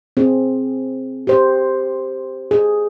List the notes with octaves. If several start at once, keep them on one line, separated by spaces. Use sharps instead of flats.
C4 G#4
G4 C5
G#4